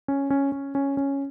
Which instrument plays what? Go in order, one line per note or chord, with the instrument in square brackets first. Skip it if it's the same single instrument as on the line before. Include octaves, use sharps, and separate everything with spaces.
[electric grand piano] C#4
C#4
C#4
C#4
C#4